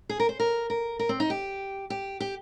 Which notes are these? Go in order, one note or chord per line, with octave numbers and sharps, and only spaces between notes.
G#4
A#4
C5
A#4
A#4
A#4
C4
D#4
G4
G4
G4